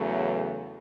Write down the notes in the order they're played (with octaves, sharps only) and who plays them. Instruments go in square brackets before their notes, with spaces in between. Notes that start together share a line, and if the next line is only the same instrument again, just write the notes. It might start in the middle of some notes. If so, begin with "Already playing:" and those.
Already playing: [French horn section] E2 C#3 F#3 A3